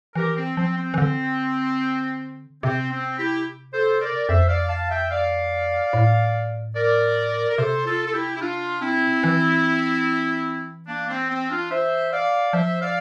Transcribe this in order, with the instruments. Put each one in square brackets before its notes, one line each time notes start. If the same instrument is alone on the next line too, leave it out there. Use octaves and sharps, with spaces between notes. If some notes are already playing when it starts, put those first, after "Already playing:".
[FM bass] E3 [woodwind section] G4 A#4
[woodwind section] C4
[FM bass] F3 [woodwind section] C4
[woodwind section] C4
[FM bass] E3
D3
[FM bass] C3 [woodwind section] C4
[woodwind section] C4
E4 G4
A4 C5
A#4 D5
[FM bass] F2 [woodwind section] C5 E5
[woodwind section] D5 F5
F5 A5
E5 G5
D5 F5
[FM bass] A2
[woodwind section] A#4 D5
A#4
[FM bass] C3 [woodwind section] A4 C5
[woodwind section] F4 A4
A4
E4 G4
E4
D4 F4
C4 E4
[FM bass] E3
[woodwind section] A#3 D4
C4
C4
D4 F4
C5 E5
D5 F5
[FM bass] F3 [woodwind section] C5 E5
[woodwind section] D5 F5